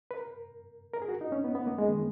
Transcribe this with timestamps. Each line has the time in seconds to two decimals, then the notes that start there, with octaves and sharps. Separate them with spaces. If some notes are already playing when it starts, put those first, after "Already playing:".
0.11 B4
0.16 A#4
0.94 A#4
1.02 G#4
1.08 F#4
1.21 D#4
1.32 C#4
1.44 B3
1.55 B3
1.67 A#3
1.78 G#3
1.89 D#3